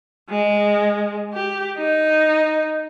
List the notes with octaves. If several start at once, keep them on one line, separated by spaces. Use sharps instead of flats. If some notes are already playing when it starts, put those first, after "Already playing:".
G#3
G4
D#4